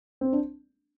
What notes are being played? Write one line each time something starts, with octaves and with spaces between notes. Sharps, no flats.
C4
D4